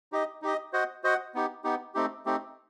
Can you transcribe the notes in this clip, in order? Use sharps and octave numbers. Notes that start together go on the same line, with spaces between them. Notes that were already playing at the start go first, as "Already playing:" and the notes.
D#4 G4 D#5
D#4 G4 D#5
F#4 C5 D#5 F#5
F#4 C5 D#5 F#5
B3 D#4 G4
B3 D#4 G4
A3 C4 D#4 G4
A3 C4 D#4 G4